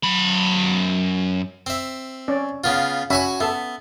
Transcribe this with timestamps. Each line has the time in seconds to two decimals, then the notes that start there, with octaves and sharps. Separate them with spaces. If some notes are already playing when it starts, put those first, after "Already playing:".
0.04 F#2 B5
1.66 C4 E5
2.28 C#4 D5
2.64 C#3 B3 F4
3.10 C#4 F#4 E5 G#5 B5 C#6
3.40 B3 A4 E5